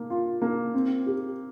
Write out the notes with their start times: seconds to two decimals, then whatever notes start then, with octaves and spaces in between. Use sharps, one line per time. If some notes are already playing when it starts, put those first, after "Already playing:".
Already playing: A#3
0.10 F4
0.42 A#3
0.74 C4
1.06 G4